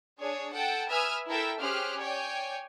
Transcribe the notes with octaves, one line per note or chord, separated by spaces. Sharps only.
D4 G#4 C#5
A4 F#5 G5 A5
B4 E5 G#5 D#6 F6
E4 A4 A#4 E5 G5
C#4 G4 G#4 C5 F6 F#6
C#5 D5 G5 G#5